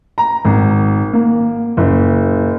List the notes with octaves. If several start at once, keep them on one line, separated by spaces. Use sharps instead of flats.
A#5
G#1
A#3
F#1